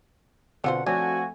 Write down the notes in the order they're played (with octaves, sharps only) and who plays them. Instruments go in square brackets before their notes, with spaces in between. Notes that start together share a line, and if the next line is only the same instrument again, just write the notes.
[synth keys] B2 D3 [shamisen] C4 F4 C5 [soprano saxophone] F#5
[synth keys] F3 A3 C4 [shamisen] D4 C#5 [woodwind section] F#4 [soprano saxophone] G#5